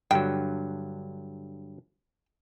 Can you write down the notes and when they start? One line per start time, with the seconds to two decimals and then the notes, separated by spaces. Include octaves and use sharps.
0.11 G2 D3 F#3 G5